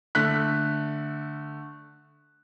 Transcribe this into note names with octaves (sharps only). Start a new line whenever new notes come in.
D3 A3 F#6 B6